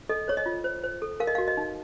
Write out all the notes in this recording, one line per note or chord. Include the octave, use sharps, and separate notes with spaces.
A4 D#5
C5 C#5
D#5
F4
C5
C5
A4
A#4 F5
D#5
F#4 F5
D#5
D#4